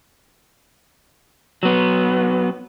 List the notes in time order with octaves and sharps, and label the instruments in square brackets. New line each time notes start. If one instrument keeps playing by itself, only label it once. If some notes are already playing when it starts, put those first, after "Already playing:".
[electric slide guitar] F#3 B3